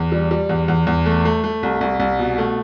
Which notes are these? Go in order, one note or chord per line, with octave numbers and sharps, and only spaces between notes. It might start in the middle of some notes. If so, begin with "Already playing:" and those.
Already playing: E2
G3
G3
E2
E2
E2
A3
A3
A3
C2
C2
C2
B2
A3